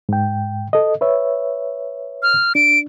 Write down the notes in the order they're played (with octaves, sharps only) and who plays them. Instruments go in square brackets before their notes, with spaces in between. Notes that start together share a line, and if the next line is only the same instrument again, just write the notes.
[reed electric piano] G#2 G5
A4 D#5
B4 C#5 E5
[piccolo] F6
[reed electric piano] D4 [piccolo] D7